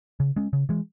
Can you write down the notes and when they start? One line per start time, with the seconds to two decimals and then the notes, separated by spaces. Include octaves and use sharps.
0.20 C#3
0.36 G#3 C#4
0.53 C#3
0.69 E3 G#3